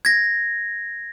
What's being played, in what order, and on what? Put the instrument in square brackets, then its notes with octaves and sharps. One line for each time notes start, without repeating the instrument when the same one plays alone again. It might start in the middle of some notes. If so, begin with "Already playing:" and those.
[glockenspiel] G#6 A#6